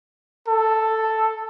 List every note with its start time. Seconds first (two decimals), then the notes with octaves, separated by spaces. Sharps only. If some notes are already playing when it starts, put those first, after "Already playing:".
0.48 A4